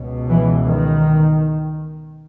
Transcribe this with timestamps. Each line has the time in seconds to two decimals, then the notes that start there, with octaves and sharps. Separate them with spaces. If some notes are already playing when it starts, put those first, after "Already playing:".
Already playing: C#2 B2
0.29 E3
0.66 D#3